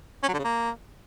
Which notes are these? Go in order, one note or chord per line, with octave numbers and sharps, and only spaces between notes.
C#4
F#3
D3
C#3
A#3